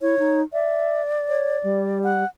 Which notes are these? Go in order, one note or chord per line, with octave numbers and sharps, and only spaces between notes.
E4 C#5
D#4
D5 E5
C#5
G3
F#5